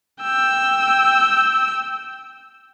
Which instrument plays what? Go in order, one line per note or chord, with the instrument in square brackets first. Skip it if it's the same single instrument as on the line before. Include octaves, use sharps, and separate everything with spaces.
[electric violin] G5 E6